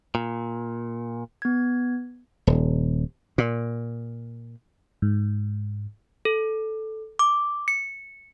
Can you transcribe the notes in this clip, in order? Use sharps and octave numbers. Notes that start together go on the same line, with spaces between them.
A#2
B3 G#6
D#1
A#2
G#2
A4
D6
C#7